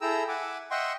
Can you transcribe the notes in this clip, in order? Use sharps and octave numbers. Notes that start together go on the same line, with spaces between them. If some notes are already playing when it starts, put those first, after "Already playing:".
E4 G#4 A4 G5 A#5 E6
E5 F#5 G#5 D6
D#5 E5 F#5 G5 C6 C#6